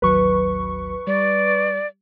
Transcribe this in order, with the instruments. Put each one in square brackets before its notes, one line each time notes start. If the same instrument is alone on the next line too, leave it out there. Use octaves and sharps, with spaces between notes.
[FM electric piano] A1 D#2 F#3 [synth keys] B4 C#6
[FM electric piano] G3 [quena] D5